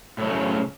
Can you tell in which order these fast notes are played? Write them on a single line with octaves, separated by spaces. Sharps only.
A2 F#3 A3 C#3